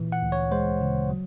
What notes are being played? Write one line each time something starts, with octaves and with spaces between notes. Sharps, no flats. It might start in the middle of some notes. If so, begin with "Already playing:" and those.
Already playing: A#2 E3
F#5
D2
C#5
G#3 C5
C#3
F#3